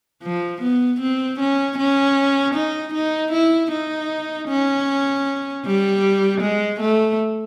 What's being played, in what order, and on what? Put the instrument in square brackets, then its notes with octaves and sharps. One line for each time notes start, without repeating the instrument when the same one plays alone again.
[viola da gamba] F3
B3
C4
C#4
C#4
D#4
D#4
E4
D#4
C#4
G3
G#3
A3